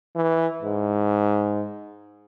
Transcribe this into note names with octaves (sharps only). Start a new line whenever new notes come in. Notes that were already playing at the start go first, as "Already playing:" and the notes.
E3
G#2